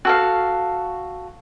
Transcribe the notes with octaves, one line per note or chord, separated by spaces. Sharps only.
F#4 A4 F5